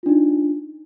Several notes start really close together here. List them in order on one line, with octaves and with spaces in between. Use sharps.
F4 D4 D#4